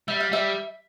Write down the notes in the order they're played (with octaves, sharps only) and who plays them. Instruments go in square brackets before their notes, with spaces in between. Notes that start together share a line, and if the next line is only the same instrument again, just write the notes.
[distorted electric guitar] G3 [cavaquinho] E5
[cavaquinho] F5
[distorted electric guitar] G3 [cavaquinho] E5